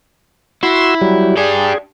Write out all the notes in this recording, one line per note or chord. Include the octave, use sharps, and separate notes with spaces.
E4 F#4 C6 E6
F#3 G3
D4 G4 G#4